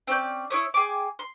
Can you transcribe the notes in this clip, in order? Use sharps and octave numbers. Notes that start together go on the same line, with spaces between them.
C4 C#4 D5 G6
E4 A#4 C#5 D#6
G#4 G5 G#5 D6
C6